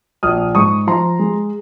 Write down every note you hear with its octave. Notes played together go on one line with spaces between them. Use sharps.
A#1 D#6 F6
G#2 C#6 D#6
F3 A#5 C6
G#3